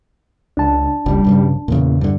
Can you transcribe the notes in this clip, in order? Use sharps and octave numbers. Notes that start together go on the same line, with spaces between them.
C#2 D4 A5
F#1 C#2 G3
B1 G2 C#3
E2 A#2 C#3
G2 D3